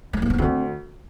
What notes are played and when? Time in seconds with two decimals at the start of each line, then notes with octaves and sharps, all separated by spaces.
0.13 A3
0.22 A#3
0.30 B3
0.38 D2 C4